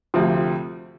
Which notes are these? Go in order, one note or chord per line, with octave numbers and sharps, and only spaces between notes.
D2 C3 F3 C4